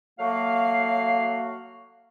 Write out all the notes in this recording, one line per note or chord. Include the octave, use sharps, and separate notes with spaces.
F#3 A3 A#3 F#4 F5